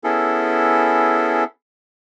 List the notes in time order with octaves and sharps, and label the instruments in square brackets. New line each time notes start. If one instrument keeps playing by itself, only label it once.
[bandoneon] B3 C#4 E4 G#4 A4